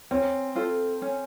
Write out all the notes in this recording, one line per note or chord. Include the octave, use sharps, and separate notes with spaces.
C4 C#4
F4 A4 C5
C#4